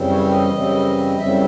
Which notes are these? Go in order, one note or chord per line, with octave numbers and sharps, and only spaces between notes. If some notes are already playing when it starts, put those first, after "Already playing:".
Already playing: F#2 C#3 E3 G3 C4
C#5
D#5
F#2 C#3 E3 G3 C4
F#2 C#3 E3 G3 C4 E5